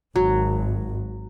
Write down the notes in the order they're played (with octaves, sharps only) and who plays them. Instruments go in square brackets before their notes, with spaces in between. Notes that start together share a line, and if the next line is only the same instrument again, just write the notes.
[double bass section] G#1 [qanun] F#3